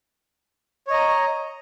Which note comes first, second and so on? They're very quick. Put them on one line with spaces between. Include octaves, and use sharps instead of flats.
C#5 D#5 A#5